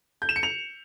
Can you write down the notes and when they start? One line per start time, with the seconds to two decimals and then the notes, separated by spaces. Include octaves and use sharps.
0.22 G6
0.29 E7
0.36 C#7
0.43 F7